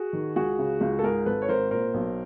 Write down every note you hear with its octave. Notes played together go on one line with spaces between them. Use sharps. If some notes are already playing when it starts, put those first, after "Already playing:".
Already playing: F#4 G#4
D#3
C#2 F#4 G#4
C#3
C#2
A4
G#2 G#4 A#4
G#1 A4 B4
C#5
G#1 A#4 C5
A#2 A#4 C5
B1